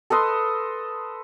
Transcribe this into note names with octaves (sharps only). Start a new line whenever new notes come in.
A4 B4 D#5 C6